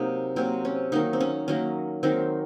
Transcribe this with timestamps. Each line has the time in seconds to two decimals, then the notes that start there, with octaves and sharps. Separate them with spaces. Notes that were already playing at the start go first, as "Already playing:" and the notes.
Already playing: C3 F#3 A#3 D#4
0.36 C3 F#3 A#3 C4
0.65 C#4
0.92 D#3 F#3 A#3 D#4
1.13 C4
1.20 C#4
1.48 D#3 F#3 A#3 C#4
2.03 D#3 F#3 A#3 C4